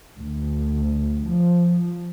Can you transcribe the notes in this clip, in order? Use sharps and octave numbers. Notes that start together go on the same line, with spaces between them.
D2
F3